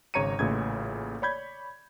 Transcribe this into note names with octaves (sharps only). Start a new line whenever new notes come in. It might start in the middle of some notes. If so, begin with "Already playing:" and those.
G#1 C#3 C#5 A#5 C#7 D#7
A1 A#2 C#3 A3 G#6
C#5 D5 B5 G6 G#6